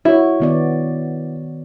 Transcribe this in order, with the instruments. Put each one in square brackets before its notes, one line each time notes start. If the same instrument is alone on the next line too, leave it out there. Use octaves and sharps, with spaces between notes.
[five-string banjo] E4 [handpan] F#4 C#5
[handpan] D#3 B3 D5